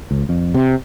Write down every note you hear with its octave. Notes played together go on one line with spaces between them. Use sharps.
C#2
F2
C3